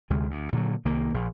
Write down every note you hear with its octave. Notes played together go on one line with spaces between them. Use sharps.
D2 C3 G#3
D2
A#2 D3 E3 F#3
C2 D#3 A#3
A#1